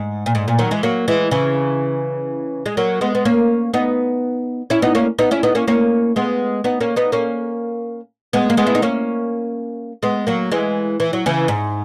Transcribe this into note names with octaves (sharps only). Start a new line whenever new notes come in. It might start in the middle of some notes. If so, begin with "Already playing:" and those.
Already playing: G#2
A#2
G#2
A#2
D#3 F#3
E3 G#3
F#3 A#3
E3 G#3
C#3 E3
G#3
F#3 A#3
G#3 B3
B3
A#3 C#4
B3 D#4
C#4 E4
B3 D#4
A#3 C#4
B3 D#4
C#4 E4
B3 D#4
A#3 C#4
A#3 C#4
G#3 B3
B3 D#4
A#3 C#4
B3 D#4
A#3 C#4
G#3 B3
A#3
G#3 B3
E4
D#4
A#3 C#4
G#3 B3
F#3 A#3
E3 G#3
E3
F#3
C#3 E3
G#2